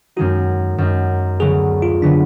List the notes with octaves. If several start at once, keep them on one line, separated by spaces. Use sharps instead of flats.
F#2 D#3 G#3 D#4 F#4
F#2 D#3 G#3 D#4
D2 D3 F#3 B3 G#4
F4
D3 F#3 B3 D4